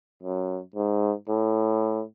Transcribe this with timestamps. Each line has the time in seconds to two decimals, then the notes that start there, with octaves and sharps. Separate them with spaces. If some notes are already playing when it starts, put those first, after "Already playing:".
0.23 F#2
0.76 G#2
1.29 A2